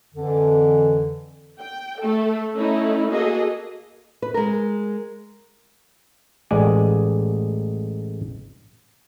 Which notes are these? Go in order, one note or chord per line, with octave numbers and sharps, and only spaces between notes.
F2 D3 E3
G5
A3 A4
A3 C#4 D#4 E4
A#3 F#4 G#4 A4 D#5
B4
G#3 A#4
A1 G#3 D5 D#5 G#5